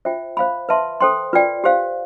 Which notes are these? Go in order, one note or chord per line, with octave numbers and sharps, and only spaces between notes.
F4 C5 E5 G5
C5 F5 B5
B4 E5 A5 C6
A4 C5 G5 C6
F4 B4 D5 G5
G4 C5 F5